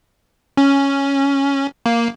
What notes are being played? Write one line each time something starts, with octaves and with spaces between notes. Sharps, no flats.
C#4
A#3